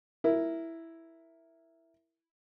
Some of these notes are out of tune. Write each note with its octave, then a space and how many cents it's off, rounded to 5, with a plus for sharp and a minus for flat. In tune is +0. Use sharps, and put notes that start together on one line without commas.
E4 +0 A#4 +0